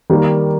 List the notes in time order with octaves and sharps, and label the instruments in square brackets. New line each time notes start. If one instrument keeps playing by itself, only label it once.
[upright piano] D#3 G3 A#3